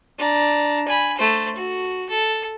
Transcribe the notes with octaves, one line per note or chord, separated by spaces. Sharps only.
D4 A#5
G#5 B5
A3 C5
F#4
A4